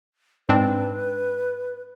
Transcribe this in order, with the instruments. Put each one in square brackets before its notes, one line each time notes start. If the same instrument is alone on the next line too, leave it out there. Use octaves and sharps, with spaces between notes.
[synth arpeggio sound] G#2 C4 D4 [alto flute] B4